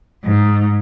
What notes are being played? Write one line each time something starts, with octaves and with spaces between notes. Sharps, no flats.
G#2